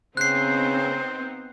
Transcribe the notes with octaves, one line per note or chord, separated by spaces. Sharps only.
C#3 B3 C4 D#4 C5 F#6 C7